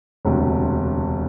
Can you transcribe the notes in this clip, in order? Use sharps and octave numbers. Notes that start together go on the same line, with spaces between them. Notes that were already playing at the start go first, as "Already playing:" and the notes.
E1 D2 C3